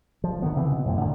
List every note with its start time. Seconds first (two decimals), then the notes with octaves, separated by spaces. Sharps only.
0.24 F3
0.42 D3 D#3 B3
0.56 C#3 E3 B3 C4
0.72 B2
0.85 F2 A2 D3
1.00 A2 D3 D#3